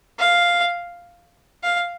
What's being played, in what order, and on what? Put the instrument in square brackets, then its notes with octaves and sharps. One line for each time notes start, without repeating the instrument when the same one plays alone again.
[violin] F5
F5